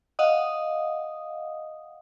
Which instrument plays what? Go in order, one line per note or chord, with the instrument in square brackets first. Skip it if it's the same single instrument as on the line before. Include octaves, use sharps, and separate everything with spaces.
[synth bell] D#5 F5 F#5 D#6